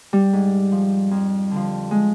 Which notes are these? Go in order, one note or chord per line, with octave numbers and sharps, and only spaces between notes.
G3
G#2
F3
F2
D3 F3
G#3